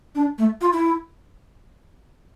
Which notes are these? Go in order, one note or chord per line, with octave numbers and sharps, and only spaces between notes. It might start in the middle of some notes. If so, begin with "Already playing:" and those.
D4
A3
F4
E4